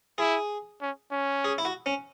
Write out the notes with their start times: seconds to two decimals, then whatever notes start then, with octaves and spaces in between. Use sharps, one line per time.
0.18 E4 G#4
0.81 C#4
1.12 C#4
1.44 G#4
1.58 E4
1.65 F#4
1.86 C#4